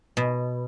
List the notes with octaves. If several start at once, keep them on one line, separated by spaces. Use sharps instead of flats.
B2